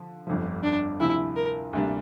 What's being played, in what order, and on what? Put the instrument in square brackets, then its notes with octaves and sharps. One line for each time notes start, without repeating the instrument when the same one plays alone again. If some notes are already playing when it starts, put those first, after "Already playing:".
Already playing: [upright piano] D3 F3
G1 F2 D3 F3
[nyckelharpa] D4
[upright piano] D2 C3 F3 [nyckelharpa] E4
[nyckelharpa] A#4
[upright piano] D2 C3 G3 A#3 D4